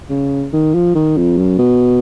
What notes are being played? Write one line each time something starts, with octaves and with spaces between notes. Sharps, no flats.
C#3
D#3
F3
D#3
F2
F#2
B2